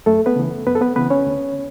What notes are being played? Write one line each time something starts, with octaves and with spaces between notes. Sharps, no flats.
F#2 A3 A4
B3 B4
C#3 E3
F#2 B3 B4
A4
B3 B4
C#3 E3 B3 B4
C#4 C#5
D2